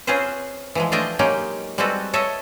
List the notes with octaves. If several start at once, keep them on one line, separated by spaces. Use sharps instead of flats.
C4 C#4 F4 G#4 B4 C5
E3 F3 G#3
A3 D4 F4 D#5 G5 G#5
F#3 G#3 A#3 C#4 D#4 G4
G3 G#3 C4 F#4 A4 B4
A4 C#5 D#5 E5